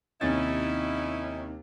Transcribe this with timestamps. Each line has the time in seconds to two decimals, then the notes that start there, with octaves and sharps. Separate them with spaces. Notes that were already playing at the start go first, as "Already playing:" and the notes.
0.21 D#2 C3 C#4 D#4 E4 A6